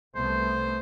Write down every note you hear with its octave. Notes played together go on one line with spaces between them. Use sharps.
C2 A3 B3 C5